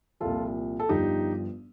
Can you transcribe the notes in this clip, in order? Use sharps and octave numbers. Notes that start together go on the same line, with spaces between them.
C2 A#2 F3 F4 A4
A4
G1 G2 F3 D#4 G4